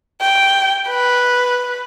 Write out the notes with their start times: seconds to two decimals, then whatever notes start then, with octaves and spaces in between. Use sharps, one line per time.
0.21 G5
0.88 B4